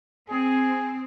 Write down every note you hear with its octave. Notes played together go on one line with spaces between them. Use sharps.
C4 G#4